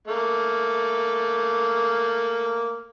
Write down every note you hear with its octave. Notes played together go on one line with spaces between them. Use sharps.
A3 A#3